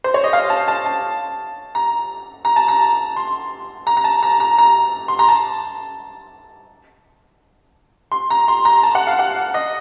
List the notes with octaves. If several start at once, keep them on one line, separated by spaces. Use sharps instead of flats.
C5
C#5
D#5
F5
A5
A5
A5
A#5
A#5
A5
A#5
C6
A#5
A#5
A5
A#5
A#5
A#5
C6
A#5
A5
C6
A#5
C6
A#5
A5
F#5
F5
F#5
D#5